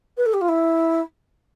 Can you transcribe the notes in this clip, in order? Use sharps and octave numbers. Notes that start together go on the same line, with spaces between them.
B4
A4
G4
F4
E4